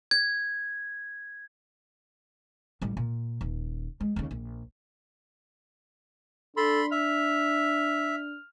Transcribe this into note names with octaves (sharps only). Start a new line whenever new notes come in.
G#6
A1 G3
A#2
D#1
G#3
D#2 C#3
A#1
D4 A4 B5 C6
E5 F6